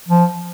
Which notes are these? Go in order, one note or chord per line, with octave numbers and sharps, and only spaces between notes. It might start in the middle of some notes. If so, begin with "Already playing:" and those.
F3